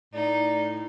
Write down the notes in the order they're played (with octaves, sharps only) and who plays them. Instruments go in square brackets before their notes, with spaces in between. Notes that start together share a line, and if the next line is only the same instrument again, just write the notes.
[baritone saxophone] A2 [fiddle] D#4 [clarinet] D5